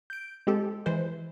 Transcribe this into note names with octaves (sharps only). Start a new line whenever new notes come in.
G6 D7
G#3 C4 G4 A4
E3 G#3 B4 C5